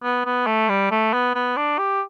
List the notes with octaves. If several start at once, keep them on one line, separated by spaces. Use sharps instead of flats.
B3
B3
A3
G3
A3
B3
B3
D4
G4